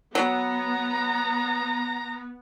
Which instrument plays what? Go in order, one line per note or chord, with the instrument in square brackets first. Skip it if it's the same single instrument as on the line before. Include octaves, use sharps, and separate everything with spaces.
[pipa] F#3 [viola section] B3 [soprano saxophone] A#5